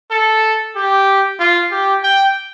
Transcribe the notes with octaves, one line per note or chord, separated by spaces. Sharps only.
A4
G4
F4
G4
G5